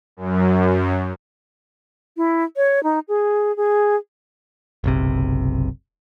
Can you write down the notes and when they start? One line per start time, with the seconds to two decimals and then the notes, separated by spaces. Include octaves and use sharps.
0.17 F#2
2.17 E4
2.57 C#5
2.83 D#4
3.08 G#4
3.57 G#4
4.84 F#1 B1 C3